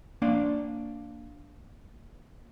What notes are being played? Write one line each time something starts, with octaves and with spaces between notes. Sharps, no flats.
A#3 D4 D5 F5